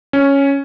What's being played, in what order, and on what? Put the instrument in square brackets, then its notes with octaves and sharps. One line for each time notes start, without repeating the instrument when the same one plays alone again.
[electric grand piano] C#4